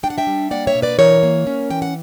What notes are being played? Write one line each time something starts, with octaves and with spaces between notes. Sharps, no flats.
D4 G5
F#5
E5 G5
G3
A#3 D5 F#5
C#5 E5
B2
B4 D5
E3 A#4 C#5
A#3
C#4
E3 G5
F#5